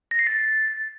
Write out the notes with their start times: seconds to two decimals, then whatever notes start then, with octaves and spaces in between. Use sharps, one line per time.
0.11 A#6
0.19 C7
0.27 A6